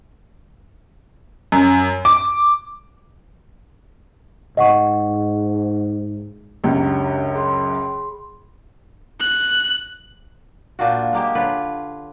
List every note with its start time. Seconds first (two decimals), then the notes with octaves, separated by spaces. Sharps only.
1.52 F#2
2.05 D6
4.57 G#2 D#5 F#5 C#6
6.64 C#2 F#2 F#3 C#4 D4 G4
7.34 G#4 B5 C6
9.20 F#6
10.79 A#2 D4 F4 F#4
11.13 G#3 A#3 G4
11.35 D3 F4 B4 C#5